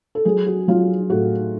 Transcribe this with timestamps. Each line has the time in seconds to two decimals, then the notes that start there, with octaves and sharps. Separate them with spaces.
0.15 A4
0.25 F#3 G#4
0.46 F#4
0.68 F#3 F4
1.10 A2 F#4